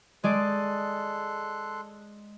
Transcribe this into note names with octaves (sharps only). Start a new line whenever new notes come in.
G#3 G#4 A4 D5 C6 F#6